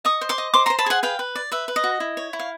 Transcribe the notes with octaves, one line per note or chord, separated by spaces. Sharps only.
D#5 C#6 D#6
C5
C6 D6
D#5
C5 C6 D6
A#5 C6
C5
A5 B5
G#4 F#5 G#5
B4 F5 G5
B4
D5
B4 E5
B4
D#5
F#4
E4
C#5
E4
F5